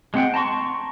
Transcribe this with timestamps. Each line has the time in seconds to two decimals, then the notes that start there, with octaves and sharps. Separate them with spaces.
0.14 G#3 C4 F#5 G5
0.34 A5 A#5 C6 C#6